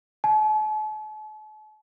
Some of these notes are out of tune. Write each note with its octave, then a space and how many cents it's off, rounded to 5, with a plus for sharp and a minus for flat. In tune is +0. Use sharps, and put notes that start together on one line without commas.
A5 -45